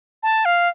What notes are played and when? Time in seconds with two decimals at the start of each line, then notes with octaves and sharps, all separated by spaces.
0.23 A5
0.45 F5